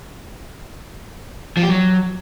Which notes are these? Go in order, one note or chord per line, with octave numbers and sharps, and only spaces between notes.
F3
G4
F#3